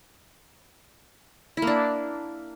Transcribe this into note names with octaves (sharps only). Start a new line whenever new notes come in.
E4
A#3
D4